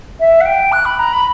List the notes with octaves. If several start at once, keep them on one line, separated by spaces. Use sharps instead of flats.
E5
F#5
G5
F#6
B5
A#5
B5